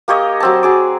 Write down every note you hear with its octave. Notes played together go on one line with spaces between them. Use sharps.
A#3 G4 C#5 D#5
F#3 C4 A5
F#3 G#4 D6